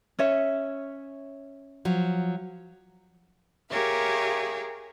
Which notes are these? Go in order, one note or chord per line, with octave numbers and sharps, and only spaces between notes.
C#4 C#5 E5
F3 F#3
G4 G#4 A#4 C#5 E5 F5